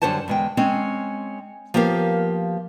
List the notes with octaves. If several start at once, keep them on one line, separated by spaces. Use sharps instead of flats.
F#2 D3 G3 C5 C#5 A5
E2 G#3 G5
G#3 C4 C#4
F3 A#3 B3 G4 A#4 F5